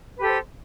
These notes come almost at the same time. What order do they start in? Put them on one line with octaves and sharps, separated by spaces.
B4 G4 A4 C5